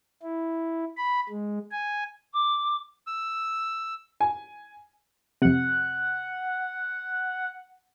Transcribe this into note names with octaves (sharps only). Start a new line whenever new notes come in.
E4
B5
G#3
G#5
D6
E6
G#5
F2 C3 F#5